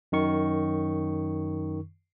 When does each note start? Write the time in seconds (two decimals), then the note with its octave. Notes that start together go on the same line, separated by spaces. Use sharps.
0.12 F#2 D#3 C#6